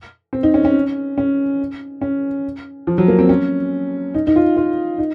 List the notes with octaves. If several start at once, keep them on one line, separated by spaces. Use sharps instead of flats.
C4
D#4
C#4
C#4
C#4
C#4
F3
F#3
A#3
C4
C#4
D#4
D#4
F4
F4
D#4